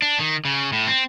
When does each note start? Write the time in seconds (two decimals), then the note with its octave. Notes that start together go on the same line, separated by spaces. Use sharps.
0.02 D4
0.20 D#3
0.45 C#3
0.72 A2
0.87 C4